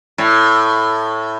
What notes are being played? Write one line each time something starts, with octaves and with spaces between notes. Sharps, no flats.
A2